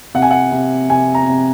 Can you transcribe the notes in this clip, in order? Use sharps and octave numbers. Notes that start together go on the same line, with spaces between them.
C3 F#5
G#5
F#5
C3
C3 G#5
A#5
C3